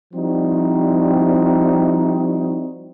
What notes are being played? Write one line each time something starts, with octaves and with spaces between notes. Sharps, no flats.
F3 G3 C4 D#4 E4 F#4